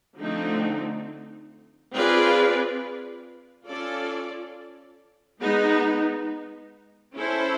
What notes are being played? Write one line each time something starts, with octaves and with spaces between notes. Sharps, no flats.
D3 F3 A3 C4 D#4
C4 F4 G#4 B4 D5
C#4 F4 A4 D5
G#3 B3 D#4
C#4 E4 A4 C5